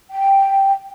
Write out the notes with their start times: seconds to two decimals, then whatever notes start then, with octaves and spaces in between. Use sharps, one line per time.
0.10 G5